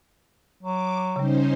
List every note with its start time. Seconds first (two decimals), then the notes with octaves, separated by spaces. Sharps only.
0.63 F#3 D6
1.16 C#3 G3 C#4 D#4 C5